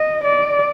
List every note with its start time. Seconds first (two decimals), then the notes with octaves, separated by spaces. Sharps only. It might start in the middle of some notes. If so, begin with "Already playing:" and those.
Already playing: D#5
0.24 D5